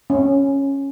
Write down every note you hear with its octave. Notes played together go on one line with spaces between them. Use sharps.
C#4